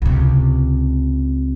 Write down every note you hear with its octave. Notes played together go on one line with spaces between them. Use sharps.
C#2 C3